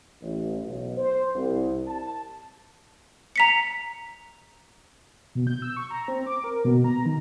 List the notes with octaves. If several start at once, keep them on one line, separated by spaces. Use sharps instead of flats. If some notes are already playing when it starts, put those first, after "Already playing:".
A1
B1
C5
C2
A5
A#5 B6 C#7
B2
G6
E6
C#6
A#5
C4
D6
A#4
B2
A#5
D#3